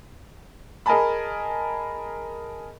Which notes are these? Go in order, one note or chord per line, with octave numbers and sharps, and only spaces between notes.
G#4 A#4 D#5 G#5 A5 B5